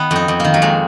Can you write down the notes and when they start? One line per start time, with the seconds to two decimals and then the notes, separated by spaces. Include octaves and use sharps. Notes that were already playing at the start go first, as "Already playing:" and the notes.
Already playing: D#3 B3
0.11 F2 D#4
0.28 F2
0.40 D#3 A#3
0.54 F#3
0.62 F2 G#3